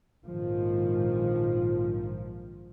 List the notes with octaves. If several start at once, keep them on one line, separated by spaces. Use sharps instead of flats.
A#1 G#2 D#3 F3